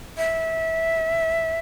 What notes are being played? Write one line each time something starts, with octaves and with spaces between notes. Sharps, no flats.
E5